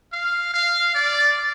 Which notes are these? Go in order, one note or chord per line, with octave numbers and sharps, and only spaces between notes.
F5
F5
D5